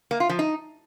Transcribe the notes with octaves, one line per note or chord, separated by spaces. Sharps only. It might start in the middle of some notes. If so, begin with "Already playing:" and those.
A#3
F4
F3
D#4